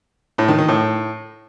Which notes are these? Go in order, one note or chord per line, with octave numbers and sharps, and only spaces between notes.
A2
D#3
D#3
A2